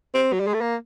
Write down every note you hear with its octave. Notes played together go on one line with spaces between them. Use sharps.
C4
F#3
G3
G#3
A3
A#3